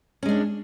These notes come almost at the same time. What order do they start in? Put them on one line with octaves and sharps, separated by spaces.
C#4 G#3 D4